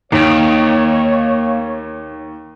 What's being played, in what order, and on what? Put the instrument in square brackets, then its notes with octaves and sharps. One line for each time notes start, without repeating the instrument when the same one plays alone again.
[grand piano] D#2 [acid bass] D#3 [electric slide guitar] A#3 G5 [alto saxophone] C#5